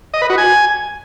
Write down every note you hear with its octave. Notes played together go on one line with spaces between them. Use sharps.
D#5
B4
F#4
G#5